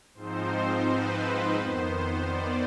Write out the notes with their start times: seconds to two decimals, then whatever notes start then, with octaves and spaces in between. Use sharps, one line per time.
0.15 G#2 F3 C4 D#4 C5
0.85 B4
1.54 F2 D#3 B3 C5
2.24 D5